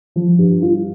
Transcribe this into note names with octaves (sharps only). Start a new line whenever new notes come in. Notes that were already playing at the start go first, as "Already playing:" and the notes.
F3
G2
F4